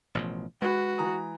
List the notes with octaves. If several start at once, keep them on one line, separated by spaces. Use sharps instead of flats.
A1 B2 F3
G#3 F#4 B4 B5
E3 A#5 D#6